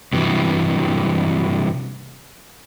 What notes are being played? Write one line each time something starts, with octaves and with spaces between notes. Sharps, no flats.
G2 C3 E3 F#3